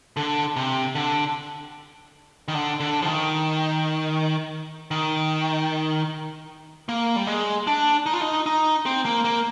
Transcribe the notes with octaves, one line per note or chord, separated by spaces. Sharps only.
D3
C3
D3
D#3
D3
D3
F3
D#3
D#3
A#3
G3
G#3
D4
D#4
F4
D#4
D#4
C4
A#3
A#3